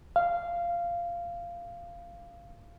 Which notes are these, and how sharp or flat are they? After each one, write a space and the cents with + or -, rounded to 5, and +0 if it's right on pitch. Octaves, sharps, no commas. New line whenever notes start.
F5 -15